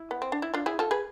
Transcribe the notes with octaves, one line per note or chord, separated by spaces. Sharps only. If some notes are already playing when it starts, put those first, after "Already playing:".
Already playing: E4
B3
C4
D4
E4
D4 F4
E4 G#4
F4 A4
G#4 B4